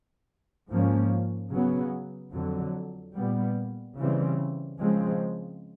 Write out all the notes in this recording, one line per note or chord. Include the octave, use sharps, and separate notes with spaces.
G#2 F3 A#3 C#4
C#3 F#3 B3
F2 D3 F#3
A#2 G3 B3
C#3 E3 G3 C4
C#3 F3 G#3 C4